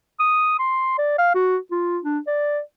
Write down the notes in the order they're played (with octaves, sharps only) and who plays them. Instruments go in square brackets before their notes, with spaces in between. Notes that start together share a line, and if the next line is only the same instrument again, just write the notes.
[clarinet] D#6
C6
D5
F5
F#4
F4
D4
D5